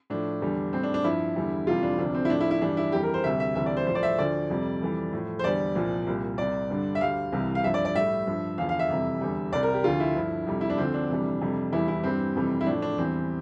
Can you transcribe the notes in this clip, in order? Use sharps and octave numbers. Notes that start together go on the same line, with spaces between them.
A2 F3 D4
E2 D3 G3
A2 G3 C4
D4
D4
G2 F3 E4
E2 D3 G3
F2 C3 E3 G3 F4
D4
D2 C3 F3 D4
C4
E4
A2 F3 D4
E4
E4
G2 E3 G3 D4
E4
F2 E3 G3 G4
A#4
C5
D2 C3 G3 E5
E5
D2 C3 E3 G3 E5
D5
C5
A2 F3 C5
D5
E5
D2 D3 F3 D5
F2 C3 G3
F2 E3 G3
A2 F3
C5
E2 D3 G3 D5
C2 A#2 F3
C2 A#2 G3
C2 C3 G3 D5
G2 D3 G3
E5
D2 D3 G3 F5
C2 C3 E3 G3
F5
G2 F3 E5
D5
D5
A2 G3 E5
G2 F3
E2 D3 F3 F5
F5
E5
F2 C3 E3 G3
E2 D3 G3
C2 C3 G3 D5
A#4
G4
D2 D3 F3 F4
E4
G2 D3 F3
F2 C3 G3
E4
D4
D2 D3 F3 C4
D4
F2 C3 E3 G3
F2 C3 G3
E2 E3 G3 E4
E4
G2 E3 G3 C4
F2 C3 E3 G3
E4
A2 F3 D4
D4
E2 E3 G3 C4